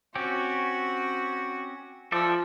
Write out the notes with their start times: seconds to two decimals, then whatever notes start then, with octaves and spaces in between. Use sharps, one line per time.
0.15 C4 C#4 F#4 G4
2.12 F3 A4 D5 E5